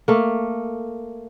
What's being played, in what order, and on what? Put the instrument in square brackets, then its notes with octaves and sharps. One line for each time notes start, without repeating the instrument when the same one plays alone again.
[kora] A3 A#3